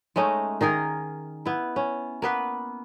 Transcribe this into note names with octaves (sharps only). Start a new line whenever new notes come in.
G#3 A3 C#4 D#4
D#3 D#4 G#4 A#4
B3 E4
C#4
A#3 B3 B4